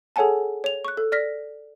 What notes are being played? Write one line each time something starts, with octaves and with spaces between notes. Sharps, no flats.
G#4 A4 C#5 F#5 G#5 A5
C#5 F7
C#6 F#6
A4
D5 F6 A#6 B6